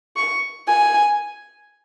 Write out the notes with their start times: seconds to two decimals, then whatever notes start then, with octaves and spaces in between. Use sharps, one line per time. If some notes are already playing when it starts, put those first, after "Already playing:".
0.16 C#6
0.68 G#5